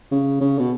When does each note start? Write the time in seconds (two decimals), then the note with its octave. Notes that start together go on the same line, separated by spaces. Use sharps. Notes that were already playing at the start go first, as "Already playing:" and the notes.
0.12 C#3
0.41 C#3
0.59 B2